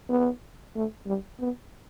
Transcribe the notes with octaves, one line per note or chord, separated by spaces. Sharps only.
B3
A3
G3
B3